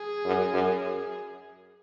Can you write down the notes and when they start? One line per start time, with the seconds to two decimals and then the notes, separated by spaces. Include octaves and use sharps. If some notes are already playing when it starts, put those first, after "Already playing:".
Already playing: G#4
0.25 F#2
0.53 F#2